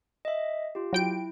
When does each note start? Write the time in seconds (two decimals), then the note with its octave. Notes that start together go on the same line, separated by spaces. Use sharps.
0.25 D#5 E5
0.75 F4 G4
0.93 F#3 E4 G5 D7